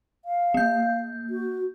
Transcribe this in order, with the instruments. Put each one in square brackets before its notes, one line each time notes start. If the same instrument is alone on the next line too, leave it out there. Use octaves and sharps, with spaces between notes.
[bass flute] F5
[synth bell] A#3 G6
[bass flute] F#4